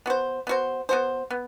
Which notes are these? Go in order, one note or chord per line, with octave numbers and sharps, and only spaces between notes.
B3 F#4 C5
B3 F#4 C5
B3 F#4 C5
B3